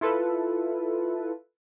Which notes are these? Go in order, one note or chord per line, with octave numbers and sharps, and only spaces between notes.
E4 F4 A4 B4